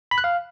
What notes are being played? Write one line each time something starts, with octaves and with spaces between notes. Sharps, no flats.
B5
F#6
F5